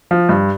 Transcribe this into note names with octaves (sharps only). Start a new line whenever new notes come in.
F3
G2